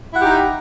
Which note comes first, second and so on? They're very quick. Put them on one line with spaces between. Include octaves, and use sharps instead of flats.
E4 F#5 G4 D#4